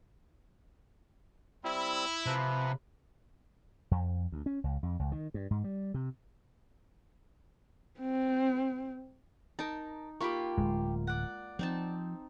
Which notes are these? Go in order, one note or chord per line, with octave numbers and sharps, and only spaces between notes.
G3 C4 E4
C3 F3 B4 B5
F2
D2
C#4
C#2
F2
C#2
D#3
G2
G#2
G3
C3
C4
D#4 A#4 A5
A#3 F4 G4 B5 C#6
D1 G#3
D5 F#5
F3 C4 D#4 A5